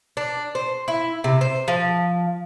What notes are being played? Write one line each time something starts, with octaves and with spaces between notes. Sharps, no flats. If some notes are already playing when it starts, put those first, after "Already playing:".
D4
C5
E4
C3
C5
F3